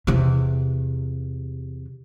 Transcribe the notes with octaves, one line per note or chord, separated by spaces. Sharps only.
E2 C3